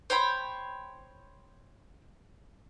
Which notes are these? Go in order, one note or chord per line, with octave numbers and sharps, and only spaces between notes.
C5 C#5 G5 B5